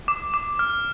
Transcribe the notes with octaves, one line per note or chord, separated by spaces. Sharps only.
D6
D6
F6